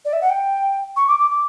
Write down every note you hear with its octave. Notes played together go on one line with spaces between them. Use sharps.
D5
E5
F#5
G5
C#6
D6
D6
D6